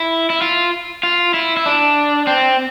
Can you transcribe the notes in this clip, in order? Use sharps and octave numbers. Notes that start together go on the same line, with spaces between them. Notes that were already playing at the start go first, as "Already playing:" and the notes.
Already playing: E4
E4
F4
F4
E4
E4
D4
C4